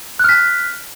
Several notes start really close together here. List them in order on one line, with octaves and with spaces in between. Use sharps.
F#6 F6 B6